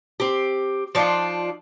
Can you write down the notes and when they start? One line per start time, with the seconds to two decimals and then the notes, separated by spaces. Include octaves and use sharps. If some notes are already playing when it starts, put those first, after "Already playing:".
0.20 C4 G4
0.95 F3 D4 D#4 F4